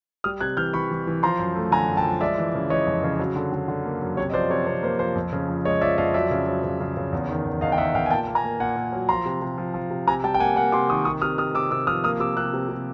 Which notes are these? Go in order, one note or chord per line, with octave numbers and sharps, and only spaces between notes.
G3 D#6 F6
C3 F#6 G#6
E3 F6 G6
E3 B5 C#6
E3
E3
F3 A#5 C6
F#2
A3
D3 G#5 A#5
F#2
G5 A5
F3
G#3 D5 E5
E3
C#3
E3 C#5 D#5
F2
C#3
F#3
D3
D3
D3
A#3
F#2
C3 C#5
D#5
F3 C5 D5
C3 C#5
C3 C#5
A#3 C5
F3 C5
F2
C#3
F3
G#3 C#5 D#5
F3 D5 E5
F2 D#5 F5
F#3 D5 E5
C#3
F#3
C#3
C#3
C#3
E2
D#3
E2
E2 D#5 F5
G5
D#3 E5 F#5
E2 F5 G5
G#5
A#2 G5 A5
A#3
G#5 A#5
A#3
A#2 F#5 G#5
A#2
F#3
F3 A#5 C6
C3
C3
F3
F3
C3
C3 G#5 A#5
G3 G5 A5
G5
A#3 F#5 G#5
A#3 F#5 G#5
C3 C6 D6
D#3 C#6 D#6
C3 C#6 D#6
C3 D#6 F6
C3 D#6 F6
C3 D6 E6
C3 D6 E6
F3 D#6 F6
A#3 D#6 F6
C3 D6 E6
C3 E6 F#6
C3
C3